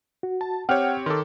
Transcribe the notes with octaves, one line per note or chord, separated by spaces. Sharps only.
F#4
A5
C4 G4 C#5 F#5 G5 F6
D#3 A4 C6 D6